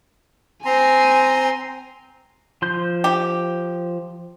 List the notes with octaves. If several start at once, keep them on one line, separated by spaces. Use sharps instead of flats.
C4 G#5 A#5 C6
F3 C6 G6
G4